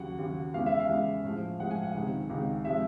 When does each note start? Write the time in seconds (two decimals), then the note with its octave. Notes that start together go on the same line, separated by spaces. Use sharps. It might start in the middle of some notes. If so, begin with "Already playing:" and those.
Already playing: D#2 C#3 F#3 F#5
0.19 D#2 C#3 F#3
0.54 E2 C#3 E3 G#3 F5
0.66 E5
0.80 F5
0.89 E2 C#3 E3 G#3
1.24 A2 F3 G#3
1.59 A2 F3 G#3 F#5
1.71 G#5
1.83 F#5
1.95 C#2 C3 D#3 G#3
2.30 C#2 C3 D#3 G#3
2.65 C3 F3 G#3 E5